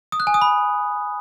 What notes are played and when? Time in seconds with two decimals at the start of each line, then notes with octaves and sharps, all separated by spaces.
0.12 D#6
0.20 F#6
0.27 G#5
0.34 D#6
0.42 B5